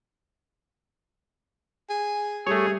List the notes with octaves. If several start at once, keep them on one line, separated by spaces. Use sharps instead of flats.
G#4
G3 A3 G#4 C#5